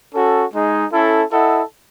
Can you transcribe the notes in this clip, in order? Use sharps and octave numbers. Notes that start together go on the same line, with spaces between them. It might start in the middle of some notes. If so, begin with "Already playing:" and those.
C#4 F#4 A4
G#3 D#4 G#4
C#4 E4 A4
E4 A4 D#5 F#5